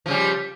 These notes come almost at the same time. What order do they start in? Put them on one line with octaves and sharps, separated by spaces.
F3 C#3 G3